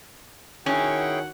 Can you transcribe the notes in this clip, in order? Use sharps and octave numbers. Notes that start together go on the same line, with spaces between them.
D#3 C#4 E4 F#4 G#4 F#5 G5